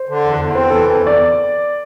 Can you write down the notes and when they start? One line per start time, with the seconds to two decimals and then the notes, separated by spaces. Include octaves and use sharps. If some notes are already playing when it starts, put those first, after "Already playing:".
Already playing: C5
0.09 D3
0.24 E2
0.40 E2
0.55 C4 C5
0.70 E3 A4
0.85 E2 A4
1.01 E2
1.07 D5